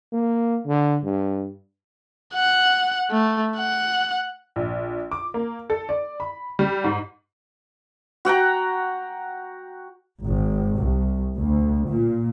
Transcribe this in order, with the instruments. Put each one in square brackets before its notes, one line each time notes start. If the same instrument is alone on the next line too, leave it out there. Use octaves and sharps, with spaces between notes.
[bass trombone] A#3
D3
G2
[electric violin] F#5
A3
F#5
[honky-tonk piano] A#1
D6
A#3
A4
D5
B5
G3
G#2
[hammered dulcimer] F#4 F#5 G5 A#5
[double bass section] G#1
C2
D2
A#2